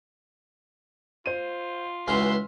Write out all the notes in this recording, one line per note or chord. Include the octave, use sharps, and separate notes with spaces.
F4 C5 D#7
C#2 E3 F#4 E5 C6 F6